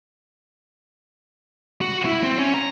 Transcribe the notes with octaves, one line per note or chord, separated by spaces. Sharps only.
F#4
E4
C4
C#4
A#5